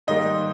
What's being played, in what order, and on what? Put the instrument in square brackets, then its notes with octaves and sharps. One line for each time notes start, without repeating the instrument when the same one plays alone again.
[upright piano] G#2 D#3 G3 A#3 D#5